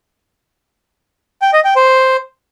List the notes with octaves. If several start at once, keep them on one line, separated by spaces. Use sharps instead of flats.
G5
D#5
G5
C5